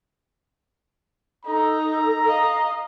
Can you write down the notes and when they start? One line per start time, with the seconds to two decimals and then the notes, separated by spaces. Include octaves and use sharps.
1.45 D#4 A4 A#5
2.26 D#5 F5